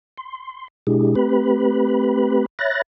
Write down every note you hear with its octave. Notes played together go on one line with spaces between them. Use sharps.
C6
B2 G#3 D4 E4 G4 G#4
A3 C4 G4 B4 B5
C#5 E5 B5 F#6 A6 A#6